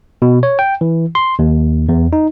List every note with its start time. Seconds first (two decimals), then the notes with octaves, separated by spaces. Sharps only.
0.22 B2
0.43 C#5
0.59 G5
0.81 E3
1.15 C6
1.39 D#2
1.89 E2
2.13 D#4